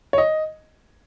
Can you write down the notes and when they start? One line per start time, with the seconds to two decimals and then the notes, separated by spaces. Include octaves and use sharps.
0.13 C#5
0.18 D#5